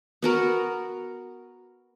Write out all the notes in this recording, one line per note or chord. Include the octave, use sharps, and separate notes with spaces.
B3 F#4 A#4